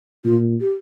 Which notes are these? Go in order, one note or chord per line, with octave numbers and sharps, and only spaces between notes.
A#2 F4
G4